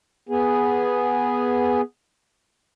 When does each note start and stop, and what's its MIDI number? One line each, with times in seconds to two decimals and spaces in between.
0.29 1.81 59
0.29 1.81 68